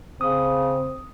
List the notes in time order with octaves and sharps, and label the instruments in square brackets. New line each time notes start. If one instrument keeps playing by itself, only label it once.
[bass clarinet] C#3 [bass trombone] C4 [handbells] D#6